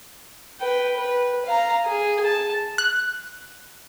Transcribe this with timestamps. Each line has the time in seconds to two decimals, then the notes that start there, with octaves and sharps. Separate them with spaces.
0.60 B4 G5
0.97 B4
1.46 F5 A#5
1.85 G#4
2.24 A5
2.78 F#6